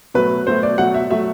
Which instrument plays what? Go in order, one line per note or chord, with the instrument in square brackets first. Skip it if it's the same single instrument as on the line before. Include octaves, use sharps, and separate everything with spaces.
[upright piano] B2 F#3 A3 B4
B2 F#3 A3 C5
D5
B2 F#3 A3 F#5
E5
B2 F#3 A3 E5